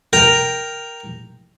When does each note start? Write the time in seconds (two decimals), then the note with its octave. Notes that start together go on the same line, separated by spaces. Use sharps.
0.13 A#4 G5 A#5